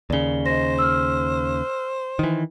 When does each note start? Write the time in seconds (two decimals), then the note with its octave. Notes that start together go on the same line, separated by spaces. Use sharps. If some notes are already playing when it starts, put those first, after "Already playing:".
0.10 D#2 C#3 D5 G7
0.46 C5 D#5 A#6
0.79 E6 F6
2.19 D#3 E3